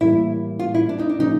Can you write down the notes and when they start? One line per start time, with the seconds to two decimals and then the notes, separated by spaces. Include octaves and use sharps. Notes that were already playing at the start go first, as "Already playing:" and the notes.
0.01 A2 E3 G3 A#3 E4
0.59 F4
0.74 E4
0.89 D4
0.99 D#4
1.09 D4
1.19 C#3 F3 A#3 D#4